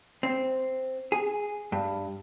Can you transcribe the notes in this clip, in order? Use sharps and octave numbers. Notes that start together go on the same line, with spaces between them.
C4
G#4
G2